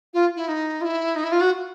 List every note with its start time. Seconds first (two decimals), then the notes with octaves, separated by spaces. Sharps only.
0.14 F4
0.36 E4
0.48 D#4
0.81 F4
0.85 E4
1.16 D#4
1.24 E4
1.32 F4
1.41 F#4